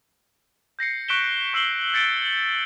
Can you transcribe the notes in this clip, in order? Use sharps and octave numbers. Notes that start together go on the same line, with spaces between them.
G6 A#6 C7 C#7
C#6 F#6 B6 D7 E7 G7
C#6 E6 C7 E7 F#7 G7
G6 A6 B6 C#7 D7 G7
F#7